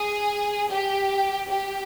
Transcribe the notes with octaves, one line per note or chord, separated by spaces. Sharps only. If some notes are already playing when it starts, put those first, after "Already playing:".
Already playing: G#4
G4
G4